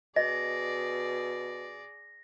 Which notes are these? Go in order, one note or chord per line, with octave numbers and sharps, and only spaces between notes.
B2 G#4 D5 D#5 A#6